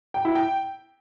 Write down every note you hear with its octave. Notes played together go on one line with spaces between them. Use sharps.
G5
E4
G5